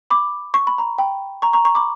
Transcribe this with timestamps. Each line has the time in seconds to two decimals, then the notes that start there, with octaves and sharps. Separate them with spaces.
0.10 B5 D6
0.54 C#6
0.67 B5
0.78 A#5 C#6
0.98 G5 B5
1.42 A#5 C#6
1.53 A#5 C#6
1.65 A#5 C#6
1.75 B5 D6